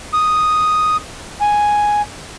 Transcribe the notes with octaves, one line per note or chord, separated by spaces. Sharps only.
D#6
G#5